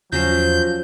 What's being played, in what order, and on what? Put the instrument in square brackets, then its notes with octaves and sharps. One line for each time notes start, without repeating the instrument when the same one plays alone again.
[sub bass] E2 [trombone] F3 [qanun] F#3 C#4 C5 [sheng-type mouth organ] G6